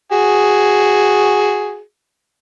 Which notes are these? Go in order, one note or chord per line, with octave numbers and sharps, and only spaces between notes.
F#4 G#4